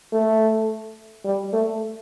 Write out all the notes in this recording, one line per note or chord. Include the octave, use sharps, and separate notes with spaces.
A3
G3
A3